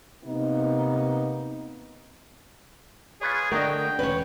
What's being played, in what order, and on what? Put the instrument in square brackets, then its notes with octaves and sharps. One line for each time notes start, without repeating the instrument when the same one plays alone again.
[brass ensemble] C3 A#3 B3 D#4
[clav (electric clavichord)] F4 B4 C#5 [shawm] G#4
[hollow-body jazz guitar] D3 A#4 [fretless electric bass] A3 [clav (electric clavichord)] F#4 D#5 [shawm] G5
[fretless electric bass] E1 C#4 [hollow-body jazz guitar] B4 C#5